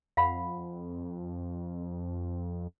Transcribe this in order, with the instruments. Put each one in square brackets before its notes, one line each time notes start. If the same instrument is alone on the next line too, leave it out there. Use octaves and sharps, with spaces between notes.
[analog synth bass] F2 [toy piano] F5 F#5 B5